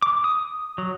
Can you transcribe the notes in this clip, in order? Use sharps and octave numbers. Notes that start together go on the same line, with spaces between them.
D6
D#6
F#3